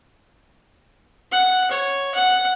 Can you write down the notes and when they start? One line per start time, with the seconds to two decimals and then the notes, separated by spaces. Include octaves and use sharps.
1.32 F#5
1.71 C#5
2.15 F#5